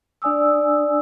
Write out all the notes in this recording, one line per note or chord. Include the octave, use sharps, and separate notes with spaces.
D4 D5 G#5 D#6 E6